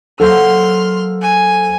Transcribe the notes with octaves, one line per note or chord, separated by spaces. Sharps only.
F#3 A#3 A4 C5 C6 F6
G#5